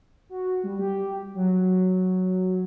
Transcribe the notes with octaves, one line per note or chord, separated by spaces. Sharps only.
F#4
G3
G4
F#3